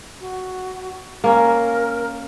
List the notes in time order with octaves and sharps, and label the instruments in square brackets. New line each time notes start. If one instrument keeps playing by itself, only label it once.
[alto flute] F#4
[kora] A#3 C#4 [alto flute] A#4